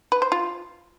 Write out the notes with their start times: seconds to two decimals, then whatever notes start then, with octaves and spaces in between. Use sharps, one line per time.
0.12 B4
0.22 C5
0.32 F4